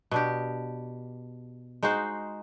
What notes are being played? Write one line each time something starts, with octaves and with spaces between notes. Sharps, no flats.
B2 D4 G4
G#3 D#4 F#4 C5